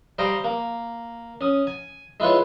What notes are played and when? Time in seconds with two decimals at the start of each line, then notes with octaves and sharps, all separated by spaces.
0.19 G3 C5 F5 G5 A#5 D#6
0.44 A#3
1.41 C#4 D#6
1.67 G#5
2.20 G#3 E4 F4 B4 C#5